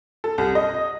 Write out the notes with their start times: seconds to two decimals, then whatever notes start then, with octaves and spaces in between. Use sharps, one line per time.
0.24 A4
0.38 C2
0.55 D#5